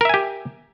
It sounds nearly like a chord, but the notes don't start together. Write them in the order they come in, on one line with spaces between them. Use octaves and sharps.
A#4 E5 G#5 G4